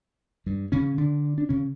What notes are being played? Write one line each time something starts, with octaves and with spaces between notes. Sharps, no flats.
G2 G3
C#3 C#4
D3 D4
D4
C#3 C#4